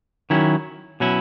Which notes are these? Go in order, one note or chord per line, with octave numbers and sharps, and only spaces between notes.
D#3 F#3 C#4 E4
B2 F#3 C#4 E4